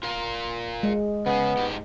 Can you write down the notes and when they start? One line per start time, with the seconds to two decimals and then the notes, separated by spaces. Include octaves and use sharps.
0.03 F4 A#4 F5
0.83 G#3
1.26 C#3 B3 G#4
1.57 G#2 G4